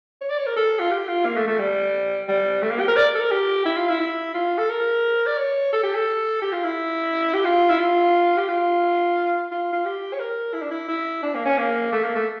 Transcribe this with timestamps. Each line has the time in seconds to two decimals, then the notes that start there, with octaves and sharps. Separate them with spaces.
0.21 C#5
0.30 D5
0.38 C#5
0.47 A#4
0.56 A4
0.79 F4
0.91 G4
1.08 F4
1.25 A#3
1.37 A3
1.48 A3
1.59 G3
2.29 G3
2.63 A3
2.71 A#3
2.80 G4
2.88 A#4
2.97 D5
3.15 A4
3.20 A#4
3.31 G4
3.66 E4
3.76 F4
3.89 E4
4.00 E4
4.34 F4
4.58 A4
4.70 A#4
5.26 D5
5.37 C#5
5.73 A4
5.83 G4
5.95 A4
6.42 G4
6.52 F4
6.64 E4
7.34 G4
7.45 F4
7.69 E4
7.79 F4
8.37 G4
8.48 F4
9.52 F4
9.73 F4
9.85 G4
10.13 C#5
10.20 A#4
10.54 E4
10.62 D4
10.71 E4
10.88 E4
11.23 D4
11.35 A#3
11.45 C#4
11.58 A#3
11.92 A3
12.04 A#3
12.15 A3